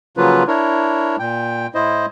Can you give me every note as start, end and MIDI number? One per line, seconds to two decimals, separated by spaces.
0.17 0.43 49
0.17 0.43 53
0.17 0.43 54
0.17 0.43 58
0.17 0.43 65
0.17 0.43 71
0.48 1.16 62
0.48 1.16 64
0.48 1.16 70
0.48 1.16 73
1.19 1.67 46
1.19 1.67 79
1.75 2.06 45
1.75 2.06 64
1.75 2.06 72
1.75 2.06 75